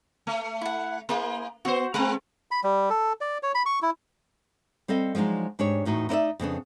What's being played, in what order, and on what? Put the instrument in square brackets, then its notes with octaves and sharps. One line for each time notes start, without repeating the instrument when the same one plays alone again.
[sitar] A3
[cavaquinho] E4 F#5
[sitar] A#3 [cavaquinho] E4 G#4 C5
[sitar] B3 C5 [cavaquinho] F#4
[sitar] G#3 C4 [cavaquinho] B4 F#5 A#5
[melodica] B5
G3
A4
D5
C#5
B5
C#6
E4
[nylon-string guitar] G3 C4 A4 D#5 F5
F3 F#3 G#3 D4 D#4
G#2 D4 G4 C#5
E2 A2 D#4 F#4
D#4 E4 B4 D5 E5
F2 C#3 B3 D4